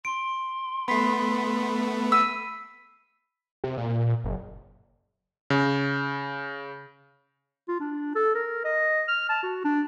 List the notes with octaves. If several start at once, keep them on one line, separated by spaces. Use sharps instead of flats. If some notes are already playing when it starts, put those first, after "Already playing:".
C6 D7
A3 B3 B5 B6 C7
E6 B6 D#7
C3
A#2
F#1
C#3
F4
D4
A4
A#4
D#5
F6
A5
F#4
D4